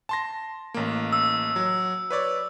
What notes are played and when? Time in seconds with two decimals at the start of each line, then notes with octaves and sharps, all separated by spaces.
0.09 A5 C6 A#6
0.74 A1 A#3
1.13 E6
1.56 F#3
2.11 B4 C#5 D5